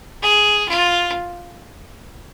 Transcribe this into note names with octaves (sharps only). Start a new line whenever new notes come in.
G#4
F4